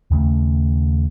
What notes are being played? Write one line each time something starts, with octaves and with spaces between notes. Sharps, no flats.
D#2 C#3 A3